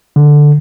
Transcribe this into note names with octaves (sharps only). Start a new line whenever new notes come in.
D3